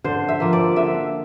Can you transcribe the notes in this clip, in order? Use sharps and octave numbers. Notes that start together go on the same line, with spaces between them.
D3 C5
E5
F3 A#3
D5
D3 E5